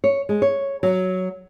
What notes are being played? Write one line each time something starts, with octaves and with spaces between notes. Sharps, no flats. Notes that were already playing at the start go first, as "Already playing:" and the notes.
C#5
G#3
C#5
F#3